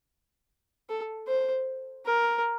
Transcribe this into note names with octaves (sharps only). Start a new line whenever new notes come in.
A4
C5
A#4